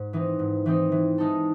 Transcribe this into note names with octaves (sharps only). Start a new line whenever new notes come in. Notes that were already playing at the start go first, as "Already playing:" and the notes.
Already playing: G#2
E3 C4 D#4
G#2
E3 C4 D#4
E3
G#3 D#4 A4